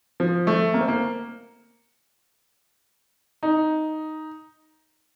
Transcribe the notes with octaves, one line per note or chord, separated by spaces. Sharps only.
F3
A3
A#3
C4
A#3
D#4